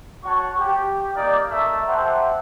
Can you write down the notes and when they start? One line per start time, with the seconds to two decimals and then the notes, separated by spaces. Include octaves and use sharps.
0.24 F#4 C#5 F#5 A5 C#6
0.58 G4
1.15 A#3 D#4 D5
1.50 A3 A#4 E5
1.87 G4 C5 E5 F#5 A5 A#5